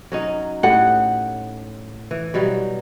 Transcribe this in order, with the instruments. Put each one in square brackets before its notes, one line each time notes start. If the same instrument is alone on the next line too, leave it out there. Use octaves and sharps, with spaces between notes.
[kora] F#3 C#4 D#4
[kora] A2 G4 [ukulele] F#5
[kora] E3
B2 F#3 G3